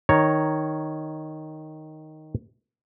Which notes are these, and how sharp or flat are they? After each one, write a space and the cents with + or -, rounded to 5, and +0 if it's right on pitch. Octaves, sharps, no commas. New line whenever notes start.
D#3 +0 C#5 +0 A#5 +0